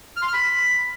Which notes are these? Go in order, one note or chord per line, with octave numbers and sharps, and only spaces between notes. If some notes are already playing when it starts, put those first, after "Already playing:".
F6
C6
F6
B5